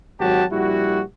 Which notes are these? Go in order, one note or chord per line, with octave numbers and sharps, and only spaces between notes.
G#1 F#3 F#4 G4 A5
A#1 G3 E4 F#4